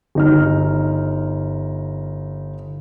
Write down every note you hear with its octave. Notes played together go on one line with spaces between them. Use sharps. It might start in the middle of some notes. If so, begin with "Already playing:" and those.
G1 D#4 F6